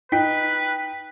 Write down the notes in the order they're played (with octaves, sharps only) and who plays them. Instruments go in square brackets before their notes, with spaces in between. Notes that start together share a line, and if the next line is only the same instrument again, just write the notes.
[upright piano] D#4 G5 B6 [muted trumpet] B4